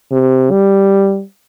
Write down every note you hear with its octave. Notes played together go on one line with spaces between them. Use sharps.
C3
G3